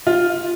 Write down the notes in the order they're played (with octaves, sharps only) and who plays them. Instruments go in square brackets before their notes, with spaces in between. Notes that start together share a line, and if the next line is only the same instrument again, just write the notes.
[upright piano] F4